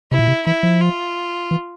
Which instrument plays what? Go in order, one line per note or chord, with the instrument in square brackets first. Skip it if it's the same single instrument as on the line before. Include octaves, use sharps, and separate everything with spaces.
[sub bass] C3 [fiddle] E4
[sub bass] A#2
C3
[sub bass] E3 [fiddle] E4
[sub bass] F3
[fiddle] F4
[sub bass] E3